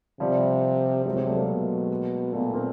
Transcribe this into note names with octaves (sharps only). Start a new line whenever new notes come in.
C3 F3 G3
C3 F#3 G#3
F#3 G#3
G3 A3
G#3 A#3
B2
A#2 A3 B3
A#3 C4